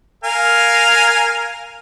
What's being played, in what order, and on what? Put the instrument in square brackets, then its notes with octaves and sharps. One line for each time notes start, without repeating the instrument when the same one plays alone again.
[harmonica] A#4 F5 G#5